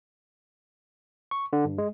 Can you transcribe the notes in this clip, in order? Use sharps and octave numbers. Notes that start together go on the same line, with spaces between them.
C#6
D3
G2
G#3